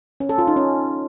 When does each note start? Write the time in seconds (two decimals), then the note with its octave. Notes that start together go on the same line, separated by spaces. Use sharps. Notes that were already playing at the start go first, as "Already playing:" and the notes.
0.20 C#4
0.29 A4
0.38 F4
0.47 D#4
0.56 C#4